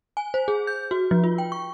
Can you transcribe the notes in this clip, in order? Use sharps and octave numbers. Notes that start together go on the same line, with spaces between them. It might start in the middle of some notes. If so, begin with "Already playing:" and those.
G#5
C5
G#4
G6
F#4
F3
F4
G5
C#6